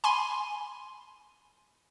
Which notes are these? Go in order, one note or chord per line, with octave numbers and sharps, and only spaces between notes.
G#5 B5 C6